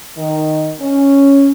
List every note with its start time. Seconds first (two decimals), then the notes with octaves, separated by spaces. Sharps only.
0.17 D#3
0.81 C#4